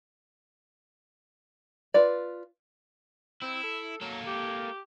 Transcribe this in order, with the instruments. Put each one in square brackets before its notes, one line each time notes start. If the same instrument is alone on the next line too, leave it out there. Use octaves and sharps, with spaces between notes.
[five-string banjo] F4 B4 D5
[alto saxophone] C4 [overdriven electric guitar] E4
[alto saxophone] A4
[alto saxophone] F#3 [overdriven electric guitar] A#3 A4
[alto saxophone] G4